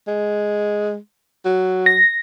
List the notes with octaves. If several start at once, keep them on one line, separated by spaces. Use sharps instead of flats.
G#3
F#3
A#6